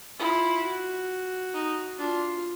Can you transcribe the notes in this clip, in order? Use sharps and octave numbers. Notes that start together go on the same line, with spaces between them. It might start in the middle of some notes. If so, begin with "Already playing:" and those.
E4 F4
F#4
D#4
D4 F4